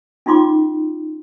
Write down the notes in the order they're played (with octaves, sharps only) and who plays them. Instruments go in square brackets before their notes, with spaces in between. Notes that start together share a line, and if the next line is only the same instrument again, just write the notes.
[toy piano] C#4 D#4 F4 C6 D6